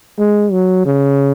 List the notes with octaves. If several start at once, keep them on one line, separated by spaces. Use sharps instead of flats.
G#3
F#3
C#3